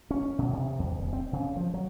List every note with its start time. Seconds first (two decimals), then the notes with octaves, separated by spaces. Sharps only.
0.11 C#4
0.39 B2
0.53 C3
0.79 E2
0.99 D1
1.13 C4
1.33 C#3
1.56 F3
1.74 F#3